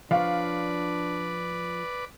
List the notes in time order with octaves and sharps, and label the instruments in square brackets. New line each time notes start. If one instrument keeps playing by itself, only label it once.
[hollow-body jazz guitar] F3 C#5 [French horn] D4 [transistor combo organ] B4 D5 [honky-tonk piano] F5